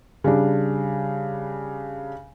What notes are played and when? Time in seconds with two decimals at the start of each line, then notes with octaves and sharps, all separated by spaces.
0.24 C#3 G3 D4